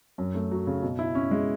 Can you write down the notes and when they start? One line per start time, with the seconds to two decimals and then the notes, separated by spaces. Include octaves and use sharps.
0.18 F#2
0.35 A3
0.51 F#3
0.67 C#3
0.83 B2
0.99 E4
1.15 C#4
1.31 G#3